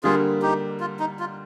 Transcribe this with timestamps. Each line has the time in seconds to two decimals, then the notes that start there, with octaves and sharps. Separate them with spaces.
0.03 D3 G3 A#3 F4 G#4
0.42 D#4 G4
0.80 F4
1.00 D#4
1.20 F4